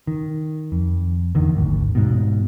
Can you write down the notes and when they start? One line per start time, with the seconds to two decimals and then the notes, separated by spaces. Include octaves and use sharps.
0.07 D#3
0.72 F2
1.35 E2 D3 D#3
1.57 G#1 D2
1.95 G#2 B2